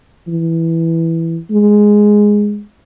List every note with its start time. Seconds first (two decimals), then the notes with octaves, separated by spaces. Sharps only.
0.28 E3
1.51 G#3